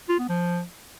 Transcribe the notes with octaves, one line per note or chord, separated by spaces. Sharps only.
F4
B3
F3